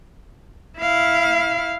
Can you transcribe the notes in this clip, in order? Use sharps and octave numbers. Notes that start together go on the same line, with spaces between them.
E4 F5